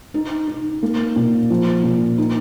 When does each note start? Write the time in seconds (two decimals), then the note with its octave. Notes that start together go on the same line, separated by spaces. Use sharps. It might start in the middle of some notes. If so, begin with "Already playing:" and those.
0.14 D#4
0.47 D#4
0.83 A#3
1.16 A#2
1.50 F3
1.84 A#2
2.18 D#4